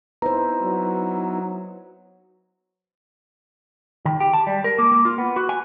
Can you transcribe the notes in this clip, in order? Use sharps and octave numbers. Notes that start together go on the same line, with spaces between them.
B3 D#4 E4 B4 C5 A#5
F#3
D#3
G4
A5
G3
A#4
A#3
A#3
F4
B3
F#4
G#5